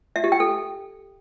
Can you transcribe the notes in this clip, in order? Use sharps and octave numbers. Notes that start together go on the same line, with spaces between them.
E5
G4
G5
A4